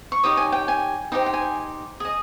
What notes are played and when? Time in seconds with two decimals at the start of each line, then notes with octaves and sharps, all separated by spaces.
0.12 C#6
0.23 D#4 G4 C#5 D#6
0.37 G#5
0.52 G5
0.68 G#5
1.12 D#4 G4 C5 G5
1.26 G5
1.33 G#5
2.00 G#4 D#5